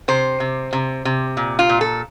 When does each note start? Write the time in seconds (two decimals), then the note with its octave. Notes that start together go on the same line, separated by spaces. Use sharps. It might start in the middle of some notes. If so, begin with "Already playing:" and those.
0.08 C3 C5
0.40 C3
0.73 C3
1.05 C3
1.37 A#2
1.59 F4
1.69 A#2
1.81 A4